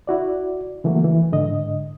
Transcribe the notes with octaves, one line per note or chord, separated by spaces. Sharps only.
E4 F#4 D5
C#3 E3 F#3 A3 A#3 F#4
E3
G#2 D3 D#5